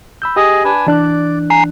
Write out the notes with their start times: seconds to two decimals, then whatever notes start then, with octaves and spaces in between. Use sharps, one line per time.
0.22 B5 E6 G6
0.36 G4 G#4 D#5
0.65 D4 B4 G#5
0.87 E3 D4 D5 F#6
1.50 G#5 A#5 C7